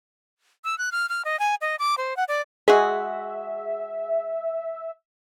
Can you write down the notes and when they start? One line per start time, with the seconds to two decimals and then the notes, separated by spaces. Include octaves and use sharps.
0.64 E6
0.78 F#6
0.92 F6
1.09 F6
1.25 D#5
1.39 G#5
1.61 D#5
1.79 D6
1.98 C5
2.17 F#5
2.28 D5
2.68 G#3 F#4 G#4 E5